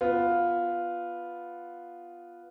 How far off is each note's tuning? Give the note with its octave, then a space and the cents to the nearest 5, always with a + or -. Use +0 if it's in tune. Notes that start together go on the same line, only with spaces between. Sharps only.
B3 +0 F4 +0